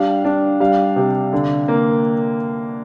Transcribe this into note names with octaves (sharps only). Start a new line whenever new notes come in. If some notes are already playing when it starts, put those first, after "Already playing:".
Already playing: G3 D4 F5
D4
G3 F5
C3
D3
A#3